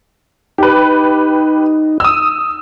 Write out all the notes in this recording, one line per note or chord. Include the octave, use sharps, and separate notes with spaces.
D#4 G4 B4
D#6 E6